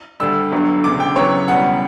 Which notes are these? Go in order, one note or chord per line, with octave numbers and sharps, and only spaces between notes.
D2 D3 G3 E6
G1 G2 D3 F#3
E1 D2 C#3 D6
G5
E2 C#3 F#3 B3 C#5
E1 E2 C#3 G3 F#5